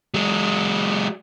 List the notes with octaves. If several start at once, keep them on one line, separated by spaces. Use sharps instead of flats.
F#3 G#3